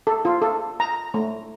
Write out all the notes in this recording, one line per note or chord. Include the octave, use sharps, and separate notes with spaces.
A4
F4
A4
A#5
A3